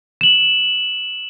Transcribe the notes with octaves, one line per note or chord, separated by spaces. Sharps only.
E7 F#7